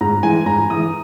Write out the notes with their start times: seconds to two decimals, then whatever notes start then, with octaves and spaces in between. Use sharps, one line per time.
0.01 G#2 A#5
0.23 E3 G#3 G#5
0.46 G#2 A#5
0.70 E3 G#3 D#6